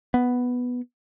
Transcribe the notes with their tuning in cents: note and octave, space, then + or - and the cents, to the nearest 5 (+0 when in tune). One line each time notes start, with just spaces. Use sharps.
B3 +0